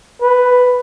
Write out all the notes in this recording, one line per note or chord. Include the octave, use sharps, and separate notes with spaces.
B4